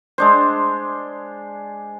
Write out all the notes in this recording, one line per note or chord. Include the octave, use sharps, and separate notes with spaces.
G#3 D4 C5